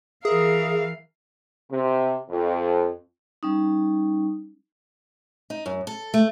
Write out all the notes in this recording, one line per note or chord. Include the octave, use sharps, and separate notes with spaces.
E3 G#4 A#4 E5 F5
C3
F2
G3 C#4 D#4
D#4
F#2
A4
A3